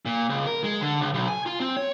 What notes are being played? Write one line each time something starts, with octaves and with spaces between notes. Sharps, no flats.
A#2
C#2
A#4
G#3
D3
C#2
B1
G#5
F4
C4
C#5